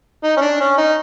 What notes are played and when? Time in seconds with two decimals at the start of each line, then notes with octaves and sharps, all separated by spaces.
0.23 D#4
0.37 C#4
0.41 D4
0.60 C#4
0.78 D#4